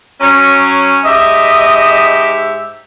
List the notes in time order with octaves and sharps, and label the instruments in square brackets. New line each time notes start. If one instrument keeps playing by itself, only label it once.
[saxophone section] F#3 C#4
[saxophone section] G#2 G4 E5 [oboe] D#5